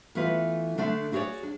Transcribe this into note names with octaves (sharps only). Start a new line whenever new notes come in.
E3 A3 B3 F4 B4
D3 A3 D4
E4 F#4 G#4 B4 C#5 D5
D4